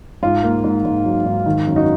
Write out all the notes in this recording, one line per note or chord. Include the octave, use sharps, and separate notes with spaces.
G#2 F4
A#3
G#2
G#2
F#3
G#2
D#3
F#2
D#4 F#4